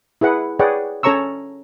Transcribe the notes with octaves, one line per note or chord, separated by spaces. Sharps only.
E4 G#4 B4 F#5
G#4 B4 C#5 D5 F#5 G5
C#4 A4 C#5 A#5 C#6 E6